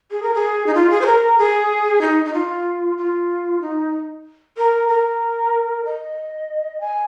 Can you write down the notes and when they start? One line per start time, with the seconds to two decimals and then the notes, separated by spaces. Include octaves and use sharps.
0.11 G#4
0.23 A#4
0.34 G#4
0.66 D#4
0.75 F4
0.90 G#4
1.01 C5
1.06 A#4
1.38 G#4
2.01 D#4
2.25 D#4
2.33 F4
2.98 F4
3.61 D#4
4.57 A#4
4.89 A#4
5.85 D#5
6.81 G#5